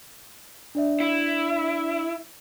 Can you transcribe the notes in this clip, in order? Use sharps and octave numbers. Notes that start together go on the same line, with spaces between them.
D4 D5 E5
E4